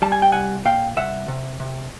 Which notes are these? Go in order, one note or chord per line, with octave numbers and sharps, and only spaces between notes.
G3 A5
G#5
G5
C2 F#5 G#5
A#2 F5 G5
C2 E5 F#5
C3
C3